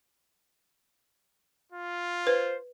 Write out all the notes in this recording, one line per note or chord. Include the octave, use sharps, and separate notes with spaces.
F4
B4 C5